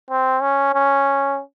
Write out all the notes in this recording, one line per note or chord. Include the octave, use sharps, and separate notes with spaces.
C4
C#4
C#4